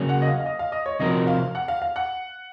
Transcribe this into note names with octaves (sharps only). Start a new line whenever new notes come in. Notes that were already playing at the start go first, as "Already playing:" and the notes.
Already playing: C#3 F#3 A#3
F#5
D#5
F5
F5
D#5
F5
D#5
C#5
C3 F3 C4 F#4 A#4 D#5
F5
F#5
F5
F5
F#5